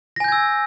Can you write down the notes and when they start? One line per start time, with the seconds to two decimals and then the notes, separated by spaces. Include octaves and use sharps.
0.16 A#6
0.20 G#5
0.24 G6
0.28 G#6
0.32 E6